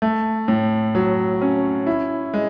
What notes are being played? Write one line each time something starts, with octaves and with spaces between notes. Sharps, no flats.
A3
A2
F#3
C#4
E4
G#3